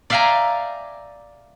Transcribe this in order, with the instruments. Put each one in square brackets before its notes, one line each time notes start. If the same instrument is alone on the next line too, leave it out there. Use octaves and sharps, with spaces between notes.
[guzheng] D5 E5 F5 G5 G#5 A#5